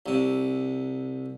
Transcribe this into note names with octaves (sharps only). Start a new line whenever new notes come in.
C2 C3